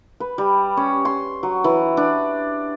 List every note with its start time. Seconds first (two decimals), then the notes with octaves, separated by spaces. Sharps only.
0.20 B4
0.38 G3
0.77 C#4
1.05 C6
1.43 F#3
1.64 E3
1.97 D4